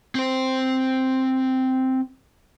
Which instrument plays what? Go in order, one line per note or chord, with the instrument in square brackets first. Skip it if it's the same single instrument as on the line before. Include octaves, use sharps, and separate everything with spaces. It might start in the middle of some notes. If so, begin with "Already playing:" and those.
[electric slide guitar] C4 C5